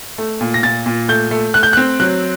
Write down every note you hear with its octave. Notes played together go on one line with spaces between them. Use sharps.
A3
A#2
A#6
A#2 A6
A#2
A3 G6
A3
A3 F#6
G6
C4 F#6
F#3 F#6